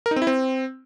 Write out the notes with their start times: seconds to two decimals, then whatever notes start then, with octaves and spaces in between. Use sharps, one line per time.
0.06 A#4
0.11 D#4
0.16 C4
0.22 E4
0.27 C4